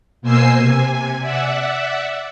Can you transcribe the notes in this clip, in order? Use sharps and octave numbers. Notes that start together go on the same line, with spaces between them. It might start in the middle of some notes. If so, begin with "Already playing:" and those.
B2 A#3 C5 G#5 E6 C7
C3 G#5
D5 E5 F#5